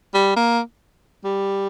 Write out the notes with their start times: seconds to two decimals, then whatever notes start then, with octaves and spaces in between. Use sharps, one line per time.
0.14 G3
0.36 A#3
1.24 G3